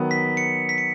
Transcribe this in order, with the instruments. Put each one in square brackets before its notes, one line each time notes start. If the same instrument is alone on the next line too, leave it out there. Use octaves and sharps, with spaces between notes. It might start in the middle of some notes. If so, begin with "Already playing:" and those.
Already playing: [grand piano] D#3 F#3 B3
[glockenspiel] B6
C#7
B6
C#7